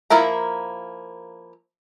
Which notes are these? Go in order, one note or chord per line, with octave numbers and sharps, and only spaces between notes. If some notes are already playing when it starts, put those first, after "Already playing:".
F3 A#3 E4 A#4 A#5